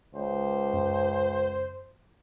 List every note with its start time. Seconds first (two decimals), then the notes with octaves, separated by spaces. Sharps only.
0.15 C#2 C5
0.73 F#2